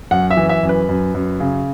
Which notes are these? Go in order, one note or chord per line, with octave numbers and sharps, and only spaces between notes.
F#2 F#5
E5
E3
E5
F#2
B4
F#2
F#2
C#3